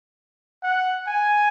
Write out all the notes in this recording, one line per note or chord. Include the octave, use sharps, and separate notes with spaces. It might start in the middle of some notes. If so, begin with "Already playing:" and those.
F#5
G#5